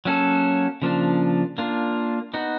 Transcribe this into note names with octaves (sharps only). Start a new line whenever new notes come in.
F#3 A#3 C#4 F#4 A4
C#3 F3 A#3 D4
A#3 D4 F4
B3 D#4 F#4